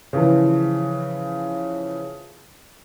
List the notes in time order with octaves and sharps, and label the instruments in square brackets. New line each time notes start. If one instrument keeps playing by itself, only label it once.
[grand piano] C#3 E3 F3